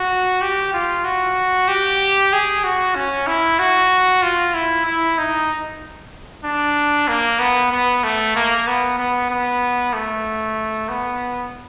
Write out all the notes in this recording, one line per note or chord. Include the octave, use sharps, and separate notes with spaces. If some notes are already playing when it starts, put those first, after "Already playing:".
Already playing: F#4
G4
F4
F#4
G4
G#4
F#4
C#4
E4
F#4
F4
E4
E4
D#4
D4
A#3
B3
B3
A3
A#3
B3
B3
B3
A3
B3